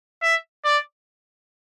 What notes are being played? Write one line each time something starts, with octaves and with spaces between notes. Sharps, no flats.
E5
D5